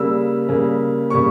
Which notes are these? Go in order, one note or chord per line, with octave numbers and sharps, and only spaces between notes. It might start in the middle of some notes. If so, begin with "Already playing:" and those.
Already playing: C#3 G3 A#3 E6
C#3 G3 A#3
C#3 G3 A#3 C#6